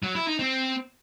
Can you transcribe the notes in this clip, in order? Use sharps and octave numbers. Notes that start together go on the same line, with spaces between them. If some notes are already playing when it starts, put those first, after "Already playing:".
F#3
E4
D#4
C4